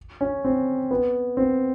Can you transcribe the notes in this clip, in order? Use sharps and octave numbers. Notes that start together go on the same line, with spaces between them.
C#4
C4
B3
C4